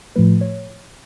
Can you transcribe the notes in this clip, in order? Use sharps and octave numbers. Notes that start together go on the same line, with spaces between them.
A2 F3 A3 B4
C#5